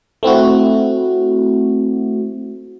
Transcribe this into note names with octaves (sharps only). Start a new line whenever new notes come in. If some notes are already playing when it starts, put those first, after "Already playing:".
A3 C4 E4 F#4